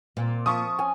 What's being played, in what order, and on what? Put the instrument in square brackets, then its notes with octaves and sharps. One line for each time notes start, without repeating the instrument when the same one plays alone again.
[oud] A#2 [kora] C4
[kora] F3 F4 E5 [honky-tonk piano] C#6 D#6
[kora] C#4 [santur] G#5